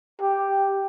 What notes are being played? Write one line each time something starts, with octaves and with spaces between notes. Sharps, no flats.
G4